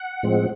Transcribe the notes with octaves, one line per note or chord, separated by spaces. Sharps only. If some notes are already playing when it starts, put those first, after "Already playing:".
Already playing: F#5
A2 F3 G#3 C4